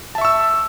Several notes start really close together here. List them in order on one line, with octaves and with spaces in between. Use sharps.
A5 E5 C#6 E6